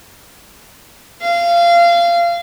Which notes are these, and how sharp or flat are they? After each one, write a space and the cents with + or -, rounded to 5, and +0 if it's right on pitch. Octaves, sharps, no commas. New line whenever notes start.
F5 -25